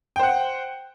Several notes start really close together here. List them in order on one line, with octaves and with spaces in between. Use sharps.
G5 C5 F#5